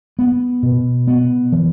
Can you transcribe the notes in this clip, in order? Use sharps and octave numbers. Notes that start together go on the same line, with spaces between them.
B3
B2
B3
E3